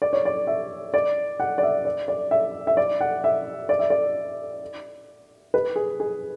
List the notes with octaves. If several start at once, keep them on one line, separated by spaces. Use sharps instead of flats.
D5
C#5
D5
E5
D5
F#5
D5
E5
D5
D5
E5
E5
D5
F#5
E5
D5
E5
D5
B4
G#4
G#4